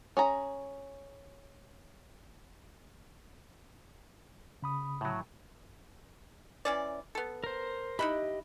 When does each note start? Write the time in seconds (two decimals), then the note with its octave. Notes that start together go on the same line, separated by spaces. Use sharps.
0.17 C#4 G#4 A#5
4.62 C#3 B5 D#6
5.01 A2 F#3
6.65 E3 C#4 D5
7.15 B3 A4
7.44 A#4 C5
7.99 D#4 E4 G4 D#5 B5 F#6